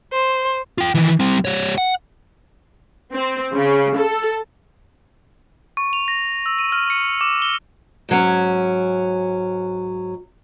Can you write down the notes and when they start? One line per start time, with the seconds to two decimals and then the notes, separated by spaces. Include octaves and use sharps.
0.13 C5
0.78 F4 G5
0.95 D#3 E3
1.20 G3 C4
1.45 G3 C#5
1.78 F#5
3.13 C4
3.54 C#3
3.97 A4
5.77 C#6
5.93 F7
6.08 A#6
6.46 E6
6.59 D#7
6.72 F6
6.90 C#7
7.21 D6
7.42 G7
8.09 G#2 F#3 C#4